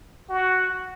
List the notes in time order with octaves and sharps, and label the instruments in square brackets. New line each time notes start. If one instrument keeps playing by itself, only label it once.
[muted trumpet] F#4